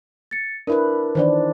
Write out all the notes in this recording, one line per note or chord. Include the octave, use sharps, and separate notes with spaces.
A6 C#7
D4 E4 A#4 B4
D#3 E3 D4 C5 D5